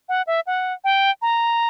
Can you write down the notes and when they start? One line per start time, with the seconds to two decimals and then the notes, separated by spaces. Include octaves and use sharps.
0.09 F#5
0.27 E5
0.47 F#5
0.84 G5
1.22 A#5